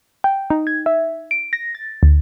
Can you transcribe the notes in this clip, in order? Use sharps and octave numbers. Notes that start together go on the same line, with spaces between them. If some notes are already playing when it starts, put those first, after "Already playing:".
G5
D#4
G#6
E5
D7
A#6
A6
D2